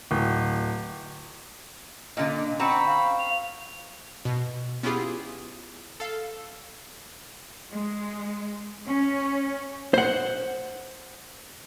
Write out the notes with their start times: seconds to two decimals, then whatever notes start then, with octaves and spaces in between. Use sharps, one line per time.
0.11 D1
2.17 A#2 D3 D#5
2.59 C4 F#4 A#5 B5
2.86 F5
3.19 F7
4.25 B2
4.83 B3 C#4 E4 F4 G4 G#4
6.00 A4 F5
7.72 G#3
8.85 C#4
9.94 C5 F#5